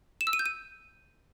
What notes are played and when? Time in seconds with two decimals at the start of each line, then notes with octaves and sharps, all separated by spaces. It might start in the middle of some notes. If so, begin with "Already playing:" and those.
0.21 E7
0.27 E6
0.33 D#7
0.39 G6
0.46 D#7